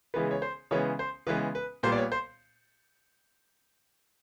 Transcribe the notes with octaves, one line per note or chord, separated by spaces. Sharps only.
C#3 E3 G#3 B3 B4
C#5
C5
C#3 E3 G#3 B3 C#5
C5
C#3 E3 G#3 B3 B4
B4
A#2 G3 B3 C5
D5
C#5
C5